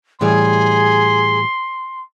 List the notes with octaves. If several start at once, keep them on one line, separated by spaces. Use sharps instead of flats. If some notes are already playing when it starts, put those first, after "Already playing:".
A2 E3 G3 G#4 C6